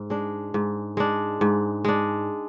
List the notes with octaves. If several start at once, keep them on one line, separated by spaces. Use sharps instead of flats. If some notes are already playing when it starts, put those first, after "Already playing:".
Already playing: G#2
G#3 D4
G#2
G#3 D4
G#2
G#3 D4